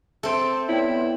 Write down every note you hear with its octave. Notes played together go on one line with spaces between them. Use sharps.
C4 A4 E5 C6 D7
B3 E4 C#5 D5 G5